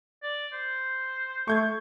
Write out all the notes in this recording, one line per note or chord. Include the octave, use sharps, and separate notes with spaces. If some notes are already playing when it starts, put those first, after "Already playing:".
D5
C5
A3 C#6 G6 G#6